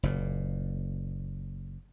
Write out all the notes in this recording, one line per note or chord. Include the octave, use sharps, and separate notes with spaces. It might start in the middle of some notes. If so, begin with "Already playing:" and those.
F#1 A#2